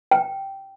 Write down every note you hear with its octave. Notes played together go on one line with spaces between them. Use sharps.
G5